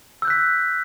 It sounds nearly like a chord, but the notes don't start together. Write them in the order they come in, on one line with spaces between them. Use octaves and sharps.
E6 G6 F#6 B6